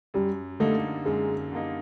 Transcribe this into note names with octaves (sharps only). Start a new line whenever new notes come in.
F#2 G3
D3 G3 A3 A#3 D#4
F#2 G#3
D3 G3 A#3 D#4